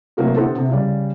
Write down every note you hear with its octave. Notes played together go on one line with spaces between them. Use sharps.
C3 F#3 A3 A#3 B4
D3 B3 G4 A4 C5
C3
C#3 G3 D5